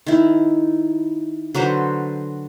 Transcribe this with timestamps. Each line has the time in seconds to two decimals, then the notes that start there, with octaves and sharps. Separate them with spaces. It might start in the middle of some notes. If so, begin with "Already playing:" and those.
0.06 D#3 E4
1.54 D3 F#3 B4 C5